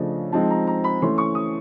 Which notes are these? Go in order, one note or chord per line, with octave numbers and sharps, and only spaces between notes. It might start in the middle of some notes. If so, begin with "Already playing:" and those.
Already playing: C#3 F3 A3 D4 D#5
F3 G#3 C4 D#4 A5
A#5
A#5
B5
E3 A3 C#4 C6
C#6
D#6